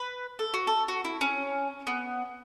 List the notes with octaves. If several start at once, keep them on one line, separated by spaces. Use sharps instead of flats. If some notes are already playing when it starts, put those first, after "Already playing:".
Already playing: B4
A4
F#4
A4
F#4
E4
C#4
B3